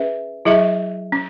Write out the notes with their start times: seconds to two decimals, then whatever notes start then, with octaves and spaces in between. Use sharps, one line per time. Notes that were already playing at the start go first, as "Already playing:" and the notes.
Already playing: C#4 G#4 B4 E5
0.45 F#3 E4 G#4 E5
1.12 C#4